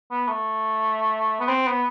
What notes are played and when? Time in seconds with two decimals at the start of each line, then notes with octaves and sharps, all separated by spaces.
0.10 B3
0.27 A3
1.40 B3
1.48 C4
1.67 B3